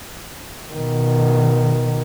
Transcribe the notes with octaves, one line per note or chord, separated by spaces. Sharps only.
B2 D#3